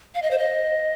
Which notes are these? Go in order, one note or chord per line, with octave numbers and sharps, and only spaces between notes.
F5
D#5
C5
D#5